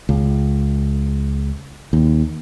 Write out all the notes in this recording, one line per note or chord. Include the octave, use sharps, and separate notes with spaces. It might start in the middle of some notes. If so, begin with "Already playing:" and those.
C#2
D#2